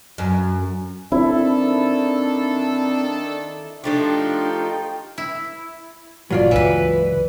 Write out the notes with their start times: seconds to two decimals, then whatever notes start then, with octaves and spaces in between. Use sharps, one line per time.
0.18 F#2
1.12 D#3 C4 D4 E4 A4
3.84 F3 A3 D4 D#4 F4 G4 G5
5.18 E4
6.30 G1 A#2 F#3 A#3 F4 D5
6.51 C#2 G2 E3 B4